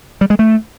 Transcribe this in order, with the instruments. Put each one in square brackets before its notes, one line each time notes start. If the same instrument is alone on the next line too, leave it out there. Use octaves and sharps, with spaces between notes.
[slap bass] G3
G#3
A3